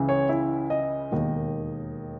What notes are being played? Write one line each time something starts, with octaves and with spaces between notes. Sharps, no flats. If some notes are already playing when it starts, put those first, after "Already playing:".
Already playing: C#2 C#3 E3
C#5
E4
D#5
E1 D#2 D#3